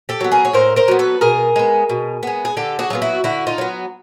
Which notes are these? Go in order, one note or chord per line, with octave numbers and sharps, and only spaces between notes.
G4 A4
F#3 B3
G#4 A#4
C#5
A2 A#4 C5
A#4 C5
F#3 B3
A4 B4
B2 G#4 A#4
G#3 B3
B2
G#3 B3
G#4
D3 G4 A4
F#4 G#4
F#3 B3 F4
E4 F#4
D3 E4 F#4
D#4 F4
F#3 B3